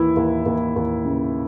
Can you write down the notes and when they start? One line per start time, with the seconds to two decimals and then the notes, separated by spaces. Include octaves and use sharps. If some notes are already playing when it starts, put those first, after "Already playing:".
Already playing: D#2 E3 E4
0.16 D#2
0.46 D#2
0.76 D#2
1.05 C#3